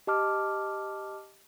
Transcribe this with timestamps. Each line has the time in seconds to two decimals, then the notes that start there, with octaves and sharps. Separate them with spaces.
0.07 G4 D#5 A5 D6 F6